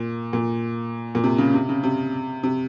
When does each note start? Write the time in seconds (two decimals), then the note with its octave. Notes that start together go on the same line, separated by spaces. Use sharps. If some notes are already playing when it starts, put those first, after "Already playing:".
Already playing: A#2
0.33 A#2
1.15 A#2
1.24 C3
1.38 C#3
1.54 C3
1.69 C#3
1.84 C3
2.43 C3